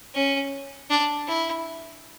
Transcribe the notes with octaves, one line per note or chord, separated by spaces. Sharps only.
C#4
D4
E4